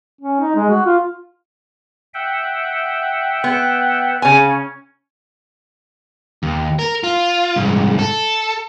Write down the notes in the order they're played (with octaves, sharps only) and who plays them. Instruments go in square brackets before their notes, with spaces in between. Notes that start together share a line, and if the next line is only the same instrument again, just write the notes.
[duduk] C#4
D#4
G#3
F#4
F4
[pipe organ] E5 F#5 G5
[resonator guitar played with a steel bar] B3
[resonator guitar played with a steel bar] C#3 G#5 [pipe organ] C#4
[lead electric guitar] D#2
A#4
F4
C2 G#2
A4